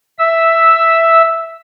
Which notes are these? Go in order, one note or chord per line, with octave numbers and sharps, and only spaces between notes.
E5 E6